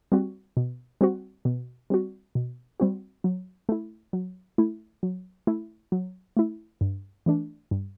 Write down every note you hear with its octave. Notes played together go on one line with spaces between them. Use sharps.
G3 C4 F#4
B2
G3 C4 F#4
B2
G3 C4 F#4
B2
G3 C4 F#4
F#3
A3 E4
F#3
A3 E4
F#3
A3 E4
F#3
A3 E4
G2
E3 A3 D4
G2